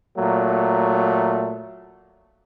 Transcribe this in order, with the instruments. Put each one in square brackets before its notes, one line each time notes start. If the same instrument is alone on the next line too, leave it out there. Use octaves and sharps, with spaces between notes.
[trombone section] A#2 F#3 A3